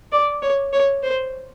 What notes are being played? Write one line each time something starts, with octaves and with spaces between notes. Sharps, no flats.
D5
C#5
C#5
C5